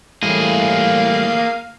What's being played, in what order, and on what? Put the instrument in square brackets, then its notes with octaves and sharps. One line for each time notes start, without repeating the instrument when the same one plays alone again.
[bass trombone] A2 [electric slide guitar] E3 G3 E4 [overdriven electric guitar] A#3 G#4 [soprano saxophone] F5